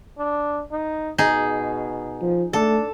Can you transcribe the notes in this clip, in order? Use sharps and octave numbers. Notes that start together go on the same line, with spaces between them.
D4
D#4
B2 D#4 G#4
F3
A3 D4 A4